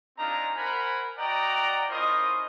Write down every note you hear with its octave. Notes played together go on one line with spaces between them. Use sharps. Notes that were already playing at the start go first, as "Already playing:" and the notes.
C4 D4 D#4 F4 G#4 A#5
A#4 C5 F#5 G#5 A#5 B5
F#4 D5 D#5 F#5 G5 A#5
C#4 E4 F4 A#4 C5 D#5